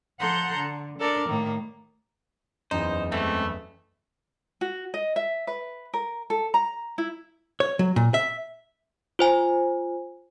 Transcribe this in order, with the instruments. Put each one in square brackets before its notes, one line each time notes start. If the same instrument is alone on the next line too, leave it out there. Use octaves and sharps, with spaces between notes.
[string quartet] F3 A4 F#5 A#5 C6 G6
D3
D4 A4 A#4 D5
A2 D#3 A#3
[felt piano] F#1 E2 [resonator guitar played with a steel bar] D#4 [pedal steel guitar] C5
[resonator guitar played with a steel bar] E3 [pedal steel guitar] G#3 C4 [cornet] A3
[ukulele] F#4
D#5
E5
B4
A#4
A4
A#5
E4
[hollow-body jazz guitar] C#5
F#3
A#2
E5
[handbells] F4 C5 G#5